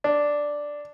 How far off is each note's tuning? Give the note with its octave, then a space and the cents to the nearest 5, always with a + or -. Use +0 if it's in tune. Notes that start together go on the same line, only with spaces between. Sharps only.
D4 +0